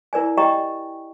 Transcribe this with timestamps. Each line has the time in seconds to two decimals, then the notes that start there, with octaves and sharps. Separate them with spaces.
0.13 E4 A#4 D5 G#5
0.37 G4 D5 D#5 G5 A#5 C#6